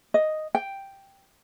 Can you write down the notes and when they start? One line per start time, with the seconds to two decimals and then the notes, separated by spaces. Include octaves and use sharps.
0.14 D#5
0.55 G5